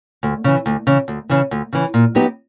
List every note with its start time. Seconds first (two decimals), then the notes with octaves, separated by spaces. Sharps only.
0.23 D2
0.44 C#3 E3
0.66 D2
0.87 C#3 E3
1.08 D2
1.29 C#3 E3
1.51 D2
1.73 C#3 E3
1.94 A#2
2.15 F#3 B3 D#4 G4